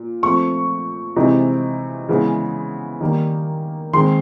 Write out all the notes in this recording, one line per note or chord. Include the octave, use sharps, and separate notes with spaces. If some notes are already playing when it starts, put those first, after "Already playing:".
Already playing: A#2
F3 A3 C4 C#6
C3 E3 G#3 C4 D#4
C#3 E3 G#3 B3
D#3 G3 A#3
D#3 G#3 C4 C6